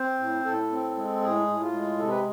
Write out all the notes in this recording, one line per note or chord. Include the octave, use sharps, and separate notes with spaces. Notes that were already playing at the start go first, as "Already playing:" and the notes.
Already playing: C4 C5
A2
A2 A4
C4
G#3
A2 G#4
A2
F4
G#3
C3 A4
B4